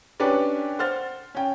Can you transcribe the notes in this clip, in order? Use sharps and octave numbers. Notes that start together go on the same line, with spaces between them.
C#4 D4 G4 B4 C#5 D5
C5 F#5 F6 A6
C#4 G5